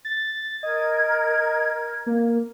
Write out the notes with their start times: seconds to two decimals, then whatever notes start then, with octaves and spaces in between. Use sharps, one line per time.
0.05 A6
0.63 A#4 D#5 G#6
2.06 A#3